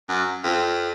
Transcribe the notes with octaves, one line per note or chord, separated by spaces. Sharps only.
F#2
F2